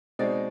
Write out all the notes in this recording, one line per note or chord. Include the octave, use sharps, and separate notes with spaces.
B2 G#3 C4 D#4 D5